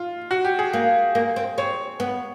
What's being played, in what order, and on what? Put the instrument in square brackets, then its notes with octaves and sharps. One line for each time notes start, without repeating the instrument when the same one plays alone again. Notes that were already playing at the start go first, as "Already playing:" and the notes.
Already playing: [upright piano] F4
F#4
G4
G#4
[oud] A#3
A#3
C4
[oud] C4 [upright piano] C#5
[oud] B3